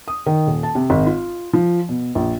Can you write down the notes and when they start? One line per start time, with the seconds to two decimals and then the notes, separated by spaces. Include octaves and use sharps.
0.08 D#6
0.26 D#3
0.47 D#1
0.63 A5
0.75 C3
0.90 G#1
1.06 F4
1.53 F3
1.89 B2
2.15 A#1